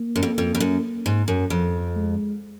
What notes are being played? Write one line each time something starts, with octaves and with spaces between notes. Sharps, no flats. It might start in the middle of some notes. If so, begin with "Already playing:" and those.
Already playing: A#3
F#2
F2
F2
F2
F#2
G#2
F#2
F2
G#3